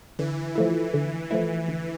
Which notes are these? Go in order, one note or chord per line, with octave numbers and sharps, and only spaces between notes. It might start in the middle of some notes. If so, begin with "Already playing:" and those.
D3 E3
F3 A3 E4
D3
F3 A3 E4
D3